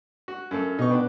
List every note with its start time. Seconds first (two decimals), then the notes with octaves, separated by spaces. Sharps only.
0.28 F#4
0.51 F#2 A#3 A4
0.79 B2 D#4 C#6
0.90 D4 B4 G5